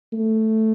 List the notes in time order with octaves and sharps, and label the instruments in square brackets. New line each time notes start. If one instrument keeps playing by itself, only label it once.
[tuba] A3